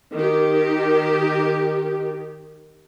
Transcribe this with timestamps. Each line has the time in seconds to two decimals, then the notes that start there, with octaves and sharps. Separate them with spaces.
0.14 D#3 G4